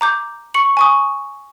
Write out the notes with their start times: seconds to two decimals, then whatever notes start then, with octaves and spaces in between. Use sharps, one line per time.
0.01 A#5 D6 G6
0.54 C#6 C#7 F#7
0.77 G#5 C#6 D#6